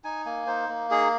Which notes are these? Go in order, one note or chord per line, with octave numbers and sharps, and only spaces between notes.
D#4 G#5
A#3 G#5
D#4 C5
A#3
D#4 G#4